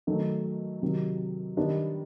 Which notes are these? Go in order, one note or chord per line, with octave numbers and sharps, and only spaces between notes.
D#3 F#3 A3
C3 D#3 F#3
D#3 G3 B3 D4